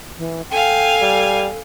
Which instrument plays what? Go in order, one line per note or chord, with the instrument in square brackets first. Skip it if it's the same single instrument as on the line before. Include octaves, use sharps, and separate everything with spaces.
[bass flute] E3
[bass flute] A4 [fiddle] F5 G#5 [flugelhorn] G5
[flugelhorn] G3